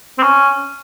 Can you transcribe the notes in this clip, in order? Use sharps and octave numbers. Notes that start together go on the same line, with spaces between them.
C4
C#4